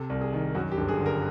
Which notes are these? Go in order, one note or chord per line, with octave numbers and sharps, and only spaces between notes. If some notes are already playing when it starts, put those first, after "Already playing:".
Already playing: C3 A4
C2
G#4
D#3
F#2 F#4
G4
G1
G#4
D3
A#4